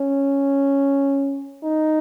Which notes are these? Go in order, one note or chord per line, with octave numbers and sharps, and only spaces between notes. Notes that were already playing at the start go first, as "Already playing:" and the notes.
Already playing: C#4
D#4